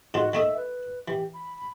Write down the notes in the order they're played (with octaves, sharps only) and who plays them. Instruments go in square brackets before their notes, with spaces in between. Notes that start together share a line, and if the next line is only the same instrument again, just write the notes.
[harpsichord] G#2 D#3 F4 [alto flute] F#4
[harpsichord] D#3 A3 D#5 [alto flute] E5
[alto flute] B4
[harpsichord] E3 [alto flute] G4
[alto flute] B5